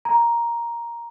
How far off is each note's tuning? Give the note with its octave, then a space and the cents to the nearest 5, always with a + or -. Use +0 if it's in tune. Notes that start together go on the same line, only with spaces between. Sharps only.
A#5 +5